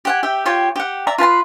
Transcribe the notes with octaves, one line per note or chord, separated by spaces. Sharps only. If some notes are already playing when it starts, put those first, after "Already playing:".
G4 F#5 G#5
G4 E5 G5
F4 G4 C#5 G5
G4 F#5
D5 E5 A#5
F4 B4 A5 C6